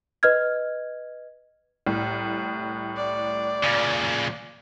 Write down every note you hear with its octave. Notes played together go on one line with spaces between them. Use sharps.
B4 D#5 F6 G#6
C2 A2
D5
A#2 C#3